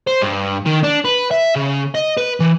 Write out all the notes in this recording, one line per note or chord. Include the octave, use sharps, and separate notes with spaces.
C5
G2
D#3
D4
B4
E5
C#3
D#5
B4
E3